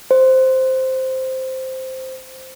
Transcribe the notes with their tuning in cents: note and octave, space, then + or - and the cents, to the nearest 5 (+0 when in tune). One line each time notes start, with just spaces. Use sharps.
C5 -5